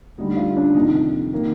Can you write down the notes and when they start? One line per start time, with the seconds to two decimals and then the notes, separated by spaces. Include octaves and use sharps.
0.18 D2 D3 G3 D#4
0.37 F4
0.57 D4
0.74 F2 C3 D#3 D#4
1.33 D#3 A#3